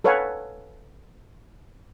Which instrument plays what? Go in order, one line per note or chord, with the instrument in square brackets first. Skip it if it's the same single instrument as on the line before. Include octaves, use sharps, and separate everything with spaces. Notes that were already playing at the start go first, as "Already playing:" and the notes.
[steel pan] A4 B4 C#5 F5 F#5 G#5